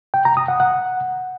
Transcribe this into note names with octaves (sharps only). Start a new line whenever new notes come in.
G5
A#5
D#6
F#5
F#5